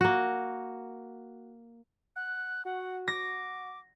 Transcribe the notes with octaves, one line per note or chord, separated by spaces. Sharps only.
A#3 F#4
F#5 F#6
F#4 F#5
D6 A#6